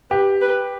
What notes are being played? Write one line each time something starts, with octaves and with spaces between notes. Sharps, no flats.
G4 B4
B4